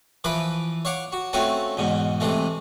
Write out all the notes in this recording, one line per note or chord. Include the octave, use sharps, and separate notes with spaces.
E3 F3 B4 B5 D6
C#5 F5 F#5 D6
F#4
A3 C4 C#4 F4 F#4
E2 G#2 B2
C3 E3 G#3 A3